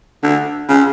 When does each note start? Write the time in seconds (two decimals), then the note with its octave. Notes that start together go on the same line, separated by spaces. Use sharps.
0.23 D3
0.69 C#3